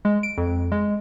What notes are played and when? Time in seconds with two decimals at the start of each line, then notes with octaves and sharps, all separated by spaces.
0.05 G#3
0.23 D7
0.38 F2
0.72 G#3